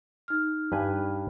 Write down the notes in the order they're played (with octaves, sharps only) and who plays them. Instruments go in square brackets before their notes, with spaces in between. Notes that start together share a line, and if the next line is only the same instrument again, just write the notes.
[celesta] D#4 F6
[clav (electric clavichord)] G2 B4 G#5